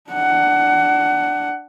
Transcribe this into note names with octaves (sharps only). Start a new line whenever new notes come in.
D4 F#5